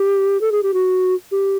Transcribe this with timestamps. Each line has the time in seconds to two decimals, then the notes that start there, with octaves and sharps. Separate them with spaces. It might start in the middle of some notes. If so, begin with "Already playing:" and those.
Already playing: G4
0.41 A4
0.52 G#4
0.63 G4
0.74 F#4
1.31 G4